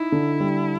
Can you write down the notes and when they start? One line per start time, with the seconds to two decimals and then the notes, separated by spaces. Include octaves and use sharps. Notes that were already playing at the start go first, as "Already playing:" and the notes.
Already playing: D#4 E4
0.12 D3
0.40 G3